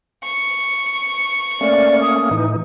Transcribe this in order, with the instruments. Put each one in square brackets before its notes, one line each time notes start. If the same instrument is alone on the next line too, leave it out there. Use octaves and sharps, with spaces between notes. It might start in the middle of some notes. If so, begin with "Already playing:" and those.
[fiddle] C#6
[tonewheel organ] A3 A#3 C#4 [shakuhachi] D5
[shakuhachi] D#6
[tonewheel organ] A2 E3 D#4